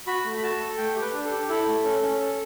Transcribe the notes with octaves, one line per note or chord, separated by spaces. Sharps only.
F#4 B5
A3
B5
F#4 A5
A4
A3 G5
G4
B4
D4
A4
G4
E4 A4
A3
C#4
C#4
A4